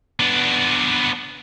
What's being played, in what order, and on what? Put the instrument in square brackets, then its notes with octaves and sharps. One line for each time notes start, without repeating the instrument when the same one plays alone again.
[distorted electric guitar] B3 D4